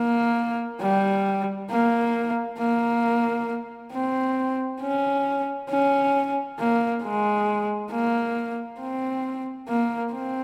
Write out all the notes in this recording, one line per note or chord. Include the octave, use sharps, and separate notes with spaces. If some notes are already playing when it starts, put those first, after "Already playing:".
Already playing: A#3
G3
A#3
A#3
C4
C#4
C#4
A#3
G#3
A#3
C4
A#3
C4